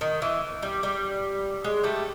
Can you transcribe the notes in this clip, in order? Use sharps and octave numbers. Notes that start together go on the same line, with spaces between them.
D#3
E3
G3
G3
G#3
G3 A3